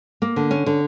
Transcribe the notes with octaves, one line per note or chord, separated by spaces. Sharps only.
A#3
D3
C#4
D3